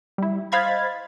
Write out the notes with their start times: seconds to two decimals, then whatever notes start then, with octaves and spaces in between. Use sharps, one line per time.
0.18 G3 E4
0.52 C5 D#5 F5 B5 G#6 A6